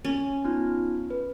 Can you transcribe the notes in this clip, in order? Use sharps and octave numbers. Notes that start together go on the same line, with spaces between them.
C#4
B3 D#4 F4
B4